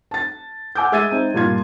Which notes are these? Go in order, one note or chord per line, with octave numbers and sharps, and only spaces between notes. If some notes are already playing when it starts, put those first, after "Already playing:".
A5 A6
F#5 G#5 D6 E6 G6
G#3 E5 E6 G#6 A6 D#7
C4 D#4
G2 A#2 F4 G#6